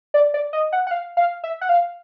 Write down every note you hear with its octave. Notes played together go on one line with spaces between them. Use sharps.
D5
D5
D#5
F#5
F#5
F5
F5
E5
F#5
F5